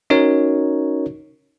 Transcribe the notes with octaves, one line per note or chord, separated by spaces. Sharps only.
C#4 D#4 F#4 A#4 C#5